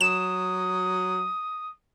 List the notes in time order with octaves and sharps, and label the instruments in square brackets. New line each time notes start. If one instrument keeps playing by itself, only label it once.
[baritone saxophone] F#3 [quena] D#6 [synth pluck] E7